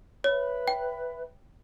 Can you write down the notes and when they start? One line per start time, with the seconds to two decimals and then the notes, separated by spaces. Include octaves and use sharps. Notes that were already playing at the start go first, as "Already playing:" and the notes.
0.24 B4 C#5 E5 B5
0.68 G5